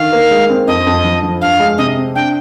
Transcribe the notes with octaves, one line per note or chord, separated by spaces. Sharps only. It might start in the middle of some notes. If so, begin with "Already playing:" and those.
Already playing: D3 D#3 F5
A#3
G#3
C4
F2 D#5
F2
F3
F3
G2 F5
G#3
C3 D#5
C4
D4 G5